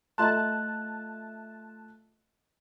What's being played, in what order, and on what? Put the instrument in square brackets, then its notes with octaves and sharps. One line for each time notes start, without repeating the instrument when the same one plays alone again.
[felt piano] A3 F4 E5 [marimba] D#5 A#5 C6 [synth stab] A5 [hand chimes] F#6